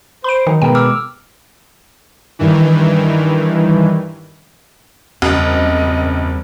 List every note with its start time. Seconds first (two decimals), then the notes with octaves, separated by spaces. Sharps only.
0.24 C5 B5 D7
0.47 D#3 F#3 D#4
0.62 B2 G#3 A#4 B4 G5
0.75 D6 E6 F6
2.39 G2 D#3 E3
5.22 F#1 E2 G2 G3 C4 D#5